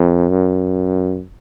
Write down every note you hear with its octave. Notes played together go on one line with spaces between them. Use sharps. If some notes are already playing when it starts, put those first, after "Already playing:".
Already playing: F2
F#2